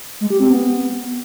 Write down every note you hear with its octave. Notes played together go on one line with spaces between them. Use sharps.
G#3
G4
C4
B3